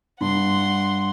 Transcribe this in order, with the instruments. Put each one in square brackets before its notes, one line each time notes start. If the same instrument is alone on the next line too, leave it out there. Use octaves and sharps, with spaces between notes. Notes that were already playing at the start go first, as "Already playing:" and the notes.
[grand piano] G2 [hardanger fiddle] F#5 C6